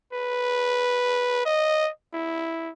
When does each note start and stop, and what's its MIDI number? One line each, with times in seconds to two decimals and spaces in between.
0.13 1.41 71
1.45 1.90 75
2.13 2.71 64